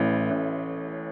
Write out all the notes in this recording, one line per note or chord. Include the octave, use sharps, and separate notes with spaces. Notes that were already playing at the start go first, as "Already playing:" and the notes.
Already playing: A1 A2 E3
A1